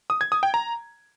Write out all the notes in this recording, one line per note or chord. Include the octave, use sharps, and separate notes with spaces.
D#6
G#6
D#6
G5
A#5